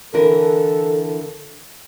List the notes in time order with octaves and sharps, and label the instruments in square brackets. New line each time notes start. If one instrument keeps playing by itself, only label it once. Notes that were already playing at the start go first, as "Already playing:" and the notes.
[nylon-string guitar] D3 E3 A#4 [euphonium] A4